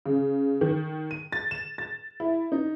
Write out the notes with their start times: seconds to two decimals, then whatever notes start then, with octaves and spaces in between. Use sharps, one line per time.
0.06 C#3
0.61 D#3
1.11 D#7
1.32 A6
1.51 E7
1.78 A6
2.20 E4
2.52 D#4